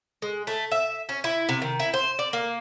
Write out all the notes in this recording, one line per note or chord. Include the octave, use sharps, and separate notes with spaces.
G#3
A3
E5
C#4
E4
C3
D#3
E4
C5
D5
A#3